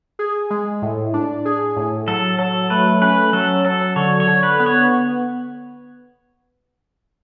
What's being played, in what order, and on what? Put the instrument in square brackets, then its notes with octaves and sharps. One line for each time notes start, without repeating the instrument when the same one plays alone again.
[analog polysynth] G#4
G#3
A2
D4
G#4
A2
[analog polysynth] F#3 [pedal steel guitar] A4
[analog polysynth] F#3 [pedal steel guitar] A4
[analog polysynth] A3 [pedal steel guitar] B4
[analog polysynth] C#4 [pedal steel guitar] B4
[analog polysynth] F#3 [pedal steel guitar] A4
[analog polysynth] F#3 [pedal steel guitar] A4
[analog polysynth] D3 [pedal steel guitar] C#5
[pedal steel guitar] C#5
[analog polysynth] D3
[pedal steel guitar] B4
[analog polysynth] B3
[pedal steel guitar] C#5